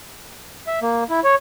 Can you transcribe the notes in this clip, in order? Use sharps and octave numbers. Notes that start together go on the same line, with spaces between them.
E5
A#3
E4
C#5